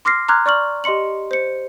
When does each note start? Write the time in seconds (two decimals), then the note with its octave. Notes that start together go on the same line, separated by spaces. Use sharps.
0.05 C6 D6 F6 A#6 C7
0.29 A#5 C6 D6 F6 F#6 G#6
0.46 D5 C#6 F6 F#7
0.84 G4 D#5 C6 C#7 F#7
1.31 C5 C#7